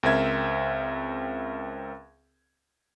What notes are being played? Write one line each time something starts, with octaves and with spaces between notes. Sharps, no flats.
C#2 C4 A#4 E5 G#6